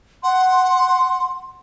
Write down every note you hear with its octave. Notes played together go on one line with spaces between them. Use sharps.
F#5 C6